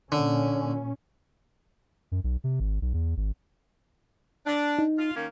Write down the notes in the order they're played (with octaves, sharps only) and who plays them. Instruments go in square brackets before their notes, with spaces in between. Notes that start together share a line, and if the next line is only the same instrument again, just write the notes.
[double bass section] A#2 C#4 [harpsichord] D3
[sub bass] F#2
B1
C3
G#1
B1
E2
G#1
[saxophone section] D4
[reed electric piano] D#4
[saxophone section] F4
D#3 A#3 C#4